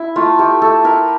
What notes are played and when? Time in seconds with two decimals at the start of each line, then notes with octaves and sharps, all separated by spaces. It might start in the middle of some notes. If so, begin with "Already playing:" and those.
Already playing: E4
0.16 A3 F4
0.39 A3 G4
0.62 A3 A4
0.84 E4 A#4